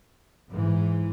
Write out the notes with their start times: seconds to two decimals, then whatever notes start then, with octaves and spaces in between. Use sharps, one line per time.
0.50 G#2 E3